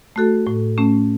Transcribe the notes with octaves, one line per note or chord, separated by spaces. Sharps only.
A3 F#4 A4
A2
A3 C#4